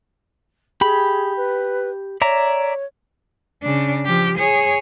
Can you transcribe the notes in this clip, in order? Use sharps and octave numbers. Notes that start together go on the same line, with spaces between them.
G4 G#4 B5
B4
C#5 D5 E5 A#5
C#3 D4
F3 G4
G#4 C#5